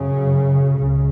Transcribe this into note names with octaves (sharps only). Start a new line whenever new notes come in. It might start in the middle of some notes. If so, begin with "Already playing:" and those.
Already playing: F#2 C#3
C#2 C#3